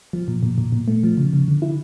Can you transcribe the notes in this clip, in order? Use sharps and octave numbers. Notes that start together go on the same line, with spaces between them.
F3
A#2
A#2
A#2
A#2
A3
F3
C#3
C#3
D3
E4